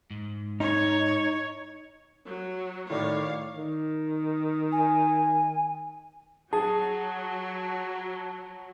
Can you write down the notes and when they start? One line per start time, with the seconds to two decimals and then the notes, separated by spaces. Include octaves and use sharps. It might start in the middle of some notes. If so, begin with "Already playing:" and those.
0.10 G#2
0.60 D#4 C#5
2.26 F#3
2.90 A2 D#3 A3 C#5 D5 F5
3.52 D#3
4.72 G#5
6.53 F#3 G#4 A5